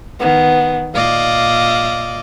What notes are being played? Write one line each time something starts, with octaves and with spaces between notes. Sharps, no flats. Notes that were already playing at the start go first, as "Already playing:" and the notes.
D#3 B3
A#2 D5 D#5 F5